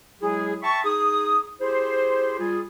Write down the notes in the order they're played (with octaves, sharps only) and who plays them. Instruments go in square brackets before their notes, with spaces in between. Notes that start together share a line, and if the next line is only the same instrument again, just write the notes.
[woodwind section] F#3 G#3 E4 G#4
E5 G5 A5 B5 C#6
D#4 G#4 D#6
E4 G4 G#4 C5
G3 F4 G#4